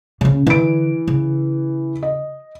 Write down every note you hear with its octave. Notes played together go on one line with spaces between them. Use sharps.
C#3 C#4
D3 E3 D7
C#3
D#5